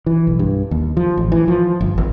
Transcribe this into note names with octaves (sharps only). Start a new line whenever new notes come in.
E3
B1
G2
D#2
F3
A1
E3
F3
G1
G#1